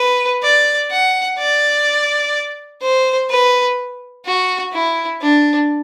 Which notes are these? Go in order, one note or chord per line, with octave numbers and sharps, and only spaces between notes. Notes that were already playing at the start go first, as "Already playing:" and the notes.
Already playing: B4
D5
F#5
D5
C5
B4
F#4
E4
D4